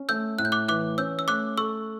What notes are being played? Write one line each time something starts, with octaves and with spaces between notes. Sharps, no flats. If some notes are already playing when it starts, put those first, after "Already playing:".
Already playing: C#4
A3 E6 G6
A2 F#6
G6
D6 F#6
E3 D6 F#6
C#4 E6 G6
E6
A3 D6 F#6
A4 C#6 E6